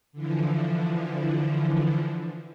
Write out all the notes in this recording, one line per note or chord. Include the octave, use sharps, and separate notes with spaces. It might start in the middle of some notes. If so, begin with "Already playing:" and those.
D3 E3 F3